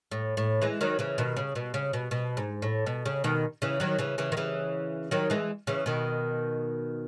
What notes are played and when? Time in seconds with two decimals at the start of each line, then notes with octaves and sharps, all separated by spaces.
0.12 A2
0.37 A2
0.62 E3 G#3
0.81 D#3 F#3
0.99 C#3 E3
1.18 B2 D#3
1.37 C#3
1.55 B2
1.74 C#3
1.93 B2
2.11 B2
2.37 G#2
2.62 A2
2.86 B2
3.05 C#3
3.24 B2 D#3
3.62 C#3 E3
3.80 D#3 F#3
3.98 C#3 E3
4.18 C#3 E3
4.32 D#3
4.37 C#3 E3
5.11 D#3 F#3
5.30 E3 G#3
5.67 C#3 E3
5.86 B2 D#3